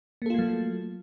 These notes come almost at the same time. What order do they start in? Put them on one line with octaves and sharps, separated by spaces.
A#3 A4 F4 A3 F#3